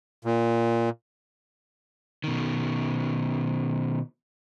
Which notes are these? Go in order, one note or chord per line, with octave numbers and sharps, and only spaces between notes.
A#2
B2 D#3